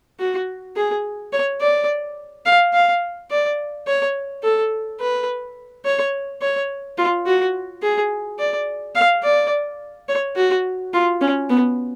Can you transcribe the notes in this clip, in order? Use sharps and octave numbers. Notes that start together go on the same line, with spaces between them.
F#4
G#4
C#5
D5
F5
F5
D5
C#5
A4
B4
C#5
C#5
F4
F#4
G#4
D5
F5
D5
C#5
F#4
F4
C#4
B3